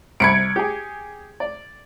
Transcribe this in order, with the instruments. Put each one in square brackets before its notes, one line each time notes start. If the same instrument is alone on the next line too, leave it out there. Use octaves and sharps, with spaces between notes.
[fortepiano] C2 B5 [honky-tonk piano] G#6 C#7 D7
[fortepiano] G4 G#4
D5